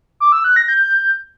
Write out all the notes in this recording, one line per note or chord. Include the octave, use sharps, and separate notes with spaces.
D6
E6
F#6
A#6
G6